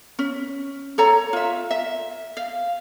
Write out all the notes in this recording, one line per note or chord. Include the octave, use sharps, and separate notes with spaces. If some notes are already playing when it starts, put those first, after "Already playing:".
C#4
A4 C#5 A#5
F4 E5
E5
F5